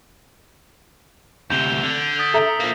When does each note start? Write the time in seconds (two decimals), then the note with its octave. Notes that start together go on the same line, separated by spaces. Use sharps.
1.50 D2 C3 G6 F7 G7
1.83 D3
2.02 D7
2.19 D#6 A6 B6
2.34 A4 E5 A#5
2.60 F3 A#3